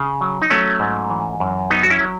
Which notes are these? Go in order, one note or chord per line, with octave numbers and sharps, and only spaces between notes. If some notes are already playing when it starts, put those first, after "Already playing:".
Already playing: C#3
F#3
D#4
F#3 A3 C#4
G#2
E3
F#2
F#3 B3 D#4
F#4
C#4 E4
F#3